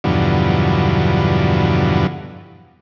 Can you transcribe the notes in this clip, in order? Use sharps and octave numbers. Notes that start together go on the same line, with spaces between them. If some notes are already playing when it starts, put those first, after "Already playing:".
E2 G2 B2 D3 F3 F#3